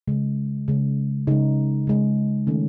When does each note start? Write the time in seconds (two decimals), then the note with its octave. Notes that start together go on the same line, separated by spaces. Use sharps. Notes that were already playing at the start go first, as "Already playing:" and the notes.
0.08 C#3 G#3
0.68 C#3 G#3
1.27 C#3 G#3 D#4
1.87 C#3 G#3
2.47 D#3 A3 C#4